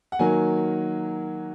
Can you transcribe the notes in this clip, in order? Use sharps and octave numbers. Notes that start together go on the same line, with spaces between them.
F#5
D#3 F#3 A#3 G#5